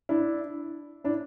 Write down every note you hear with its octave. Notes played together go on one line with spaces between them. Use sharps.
D4 E4
D4 E4